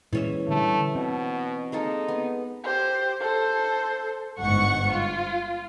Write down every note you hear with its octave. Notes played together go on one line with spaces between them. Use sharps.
A#2 E3 G#3 C#4 E5
D3 G3 A3
B2 C4
G#3 A#3 D#4 A4
B3
G4 C5
A4 C5
G1 G#2 F#5 C#6 C#7
F4